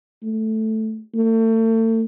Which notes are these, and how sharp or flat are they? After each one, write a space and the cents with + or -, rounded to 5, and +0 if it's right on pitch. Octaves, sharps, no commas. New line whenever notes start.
A3 -5
A3 +35